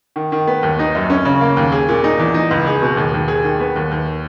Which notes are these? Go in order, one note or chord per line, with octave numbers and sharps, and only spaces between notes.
D#3
D#3
B3
D#2
D#4
F#2
C#4
C#3
A#3
D#2
G#4
A#2
D#4
E2
D#4
C#2
G#4
B2
D#2
D#2
G#4
D#3
B3
D#2
D#2